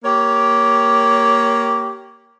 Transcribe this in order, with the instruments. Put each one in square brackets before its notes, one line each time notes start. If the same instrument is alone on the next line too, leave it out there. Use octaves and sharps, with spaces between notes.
[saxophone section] A#3 G4 C#5